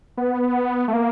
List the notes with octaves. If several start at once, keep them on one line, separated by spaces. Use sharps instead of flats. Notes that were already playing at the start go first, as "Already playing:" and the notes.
B3
A3
A#3